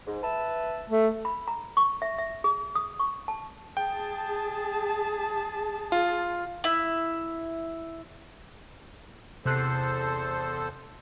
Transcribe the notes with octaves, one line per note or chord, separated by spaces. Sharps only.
G#2
B4 E5 A5
A3
B5
A#5
C#6
E5
E5
G#4
D#6
C#6
A5
G#4 G5 A5
F4
E4
E2 C3 A4 C5 F#6 C7